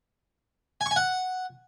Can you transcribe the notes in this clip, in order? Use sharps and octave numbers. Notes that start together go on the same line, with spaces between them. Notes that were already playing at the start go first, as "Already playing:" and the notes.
G#5
C#6
G#5
F#5